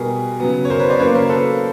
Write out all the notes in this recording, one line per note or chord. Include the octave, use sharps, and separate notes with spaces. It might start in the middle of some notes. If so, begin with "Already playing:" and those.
Already playing: B2 G3 B3 G#4 A#4
C#3 F#3 B3
C#5
A#4 C5
B4 C#5
C5 D5
C#3 F#3 A#3 B4 C#5
A#4 C5
A4 B4